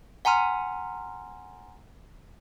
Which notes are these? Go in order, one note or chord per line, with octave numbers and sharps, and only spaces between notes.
F#5 G#5 A#5 C6 F6